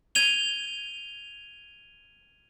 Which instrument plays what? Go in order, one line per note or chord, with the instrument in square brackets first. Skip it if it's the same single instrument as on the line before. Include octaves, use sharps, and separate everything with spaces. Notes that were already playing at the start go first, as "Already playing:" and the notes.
[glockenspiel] G#6 D#7 F7 G7